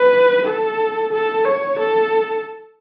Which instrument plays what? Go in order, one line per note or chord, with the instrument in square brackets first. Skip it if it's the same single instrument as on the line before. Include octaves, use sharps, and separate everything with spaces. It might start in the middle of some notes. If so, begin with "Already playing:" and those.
Already playing: [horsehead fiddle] B4
A4
A4
C#5
A4